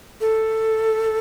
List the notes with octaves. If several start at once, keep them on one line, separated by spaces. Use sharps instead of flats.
A4